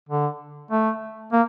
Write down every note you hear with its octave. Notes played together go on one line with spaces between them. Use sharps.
D3
A3
A#3